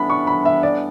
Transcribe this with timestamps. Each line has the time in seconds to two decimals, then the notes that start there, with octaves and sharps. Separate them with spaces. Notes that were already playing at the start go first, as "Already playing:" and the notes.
Already playing: A2 E3 G3 B3 D4 B5
0.10 C#6
0.27 B5
0.45 E5
0.63 D5